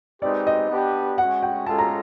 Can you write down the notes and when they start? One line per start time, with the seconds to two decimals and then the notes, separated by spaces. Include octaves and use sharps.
0.22 G#3 C4 D#4 G4 B4 D5
0.47 D#5
0.70 B3 D4 G4 B4
1.18 G#3 C#4 F#4 F#5
1.43 G5
1.67 G#3 C#4 F4 A4 A5
1.78 A#5